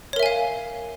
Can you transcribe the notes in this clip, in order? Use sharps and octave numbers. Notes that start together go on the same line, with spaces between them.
A#4 C#5 E5 F5 G#5